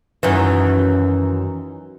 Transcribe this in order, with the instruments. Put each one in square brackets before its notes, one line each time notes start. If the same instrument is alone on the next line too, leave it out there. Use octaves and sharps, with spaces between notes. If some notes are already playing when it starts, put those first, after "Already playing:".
[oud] F#2 D#3 E3